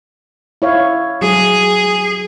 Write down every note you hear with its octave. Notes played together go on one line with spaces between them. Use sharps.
E4 C#5 F5
F#3 G#4